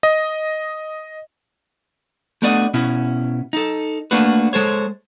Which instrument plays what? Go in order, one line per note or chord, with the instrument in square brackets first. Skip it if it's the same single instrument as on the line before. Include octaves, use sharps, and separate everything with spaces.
[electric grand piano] D#5
[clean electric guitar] A3 B3 D4 F#4 D5 D#5
B2 C#4 E4
D#4 A4
A3 A#3 D4 F#4 B4
G#3 A4 C5 C#5